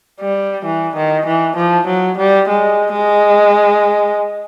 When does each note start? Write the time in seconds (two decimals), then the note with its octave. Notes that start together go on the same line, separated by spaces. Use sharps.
0.20 G3
0.65 E3
0.96 D#3
1.26 E3
1.56 F3
1.87 F#3
2.18 G3
2.48 G#3
2.93 G#3